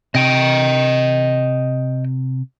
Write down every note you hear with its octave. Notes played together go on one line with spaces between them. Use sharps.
C3 D#5 G5